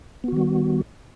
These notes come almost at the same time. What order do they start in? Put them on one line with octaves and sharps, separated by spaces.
B3 F#4 D#3 G3